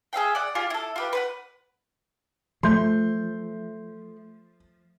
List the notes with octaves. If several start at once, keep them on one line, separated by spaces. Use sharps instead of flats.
G#4 E5 F5 G5
D5 F#5
F4 G4 G#4 G#5
E4 A4
F4 G4 B4
B4 C5 F#5
F3 A3 C6 G6